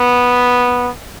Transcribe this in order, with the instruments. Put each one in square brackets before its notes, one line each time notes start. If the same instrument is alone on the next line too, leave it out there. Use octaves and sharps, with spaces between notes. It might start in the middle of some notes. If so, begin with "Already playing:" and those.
Already playing: [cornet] B3